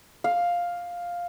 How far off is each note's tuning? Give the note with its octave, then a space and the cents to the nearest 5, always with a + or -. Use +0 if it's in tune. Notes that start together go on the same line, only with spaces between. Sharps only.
F5 +5